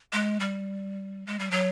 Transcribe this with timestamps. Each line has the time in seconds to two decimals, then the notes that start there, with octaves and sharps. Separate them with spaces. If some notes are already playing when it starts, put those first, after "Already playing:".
0.13 G#3
0.40 G3
1.27 G#3
1.39 G3
1.51 F#3